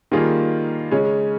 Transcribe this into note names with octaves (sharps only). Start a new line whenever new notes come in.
D#3 G3 A#3 F4 G#4
C#3 G#3 C#4